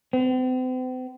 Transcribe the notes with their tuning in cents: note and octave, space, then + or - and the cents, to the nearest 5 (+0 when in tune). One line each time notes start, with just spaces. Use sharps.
C4 -45